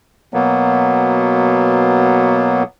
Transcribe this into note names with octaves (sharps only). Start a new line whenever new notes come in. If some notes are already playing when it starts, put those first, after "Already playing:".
B2 F#3 A#3 B3